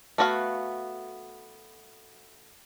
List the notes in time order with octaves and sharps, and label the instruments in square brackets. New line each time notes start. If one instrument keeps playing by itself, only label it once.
[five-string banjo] A3 B3 F#4 C#5 F5